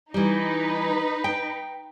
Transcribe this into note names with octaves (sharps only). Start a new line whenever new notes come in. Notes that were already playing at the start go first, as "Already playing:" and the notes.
E3 G3 D#4 B4
G5